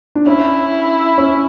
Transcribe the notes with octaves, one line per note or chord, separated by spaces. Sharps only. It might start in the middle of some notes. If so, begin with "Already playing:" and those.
D4
C#4 E4
C#4